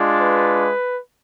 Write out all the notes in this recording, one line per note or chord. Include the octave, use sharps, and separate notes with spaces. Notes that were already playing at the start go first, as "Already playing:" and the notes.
Already playing: G#3 D4 F4
B4